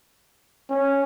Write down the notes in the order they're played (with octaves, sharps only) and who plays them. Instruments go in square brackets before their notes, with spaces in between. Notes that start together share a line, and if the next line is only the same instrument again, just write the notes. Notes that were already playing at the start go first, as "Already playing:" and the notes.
[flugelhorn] C#4